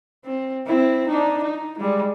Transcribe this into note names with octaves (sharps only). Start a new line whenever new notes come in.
C4
C4 E4
D4 D#4
D#4
G3 G#3